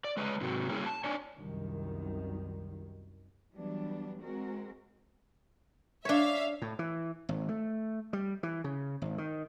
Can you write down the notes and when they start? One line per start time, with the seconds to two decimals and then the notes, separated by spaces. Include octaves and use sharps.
0.04 D5
0.17 G#3 B4 C#5 D#5
0.41 G#2 C3 F#3
0.69 G3 A#3 C#4 E4 G#4
0.86 A5
1.04 D4 C#5 D5 G#5
1.37 C2 F#2 D#3
3.54 E3 F#3 G3 B3 D4
4.22 G#3 C4 F#4 A#4
6.05 D4 C#5 E5 F5
6.62 A2
6.79 E3
7.29 G#1
7.49 A3
8.13 G3
8.43 E3
8.64 C#3
9.02 G#1
9.18 D#3